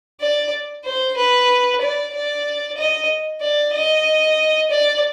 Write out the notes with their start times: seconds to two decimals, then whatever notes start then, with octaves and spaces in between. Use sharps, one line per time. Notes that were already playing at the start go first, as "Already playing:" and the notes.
0.21 D5
0.85 C5
1.17 B4
1.81 D5
2.13 D5
2.77 D#5
3.41 D5
3.74 D#5
4.70 D5